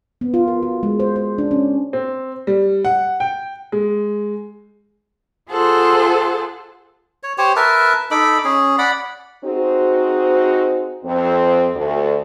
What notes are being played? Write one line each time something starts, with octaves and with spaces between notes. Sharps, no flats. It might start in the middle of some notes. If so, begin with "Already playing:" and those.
B3
F4
A#4
F#4
G#3
C5
C5
D4
C#4
C4
G3
F#5
G5
G#3
F4 G#4 A4 C5 F#5
C#5
G4 C5 C#5
A#4 B4 E5 A5
D#4 A4 B5 D6
C#4 G#4
D5 F#5 B5
C4 D#4 F#4 G#4 C5
F2 C4
D2